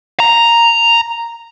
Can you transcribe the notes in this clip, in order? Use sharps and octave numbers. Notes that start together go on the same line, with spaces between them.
A#5